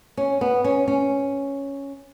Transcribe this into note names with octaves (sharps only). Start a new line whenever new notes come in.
C#4
B3
C#4
C#4